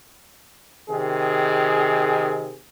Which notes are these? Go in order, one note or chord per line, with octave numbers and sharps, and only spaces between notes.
C3 D#3 G#4